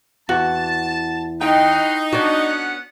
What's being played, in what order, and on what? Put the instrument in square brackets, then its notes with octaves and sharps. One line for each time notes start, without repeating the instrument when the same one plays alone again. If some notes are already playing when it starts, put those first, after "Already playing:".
[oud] E2 [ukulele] F#4 [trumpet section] A5
[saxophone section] D#4 [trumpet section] F#4 B4 C6 [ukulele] G5
[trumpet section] B3 C#4 F#5 [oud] D4 F#4